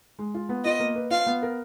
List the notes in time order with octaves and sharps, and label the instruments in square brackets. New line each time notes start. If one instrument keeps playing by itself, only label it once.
[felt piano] G#3
F4
B3
[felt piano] F4 [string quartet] D#5
[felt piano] A#3
B4
[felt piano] F4 [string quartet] F5
[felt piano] B3
A#4